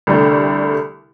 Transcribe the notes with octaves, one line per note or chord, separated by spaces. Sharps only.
C2 D3 G3 A3